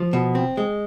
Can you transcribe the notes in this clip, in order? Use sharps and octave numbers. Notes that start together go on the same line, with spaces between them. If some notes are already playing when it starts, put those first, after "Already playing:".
Already playing: F3
B2
C4
G#3